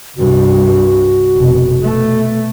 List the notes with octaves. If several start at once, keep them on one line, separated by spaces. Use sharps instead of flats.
C2 G2 F#4
F1 B2
B2 A3